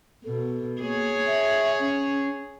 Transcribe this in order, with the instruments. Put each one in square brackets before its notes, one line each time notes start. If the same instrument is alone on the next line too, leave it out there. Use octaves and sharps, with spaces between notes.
[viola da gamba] B2 [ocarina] A4
[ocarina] A#3 [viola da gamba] G#4 C#5
[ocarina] E5
C#4